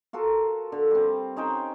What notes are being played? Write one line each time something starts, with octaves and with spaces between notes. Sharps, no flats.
F4 F#4 A4 A#4
D3
G3 C4
C#4 D#4 C5 G5